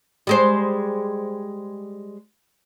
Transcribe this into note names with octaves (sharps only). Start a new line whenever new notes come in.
G3 G#3 C5